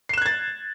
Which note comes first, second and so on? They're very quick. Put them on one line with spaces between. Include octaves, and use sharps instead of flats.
C7 E7 F#6 G#6 A6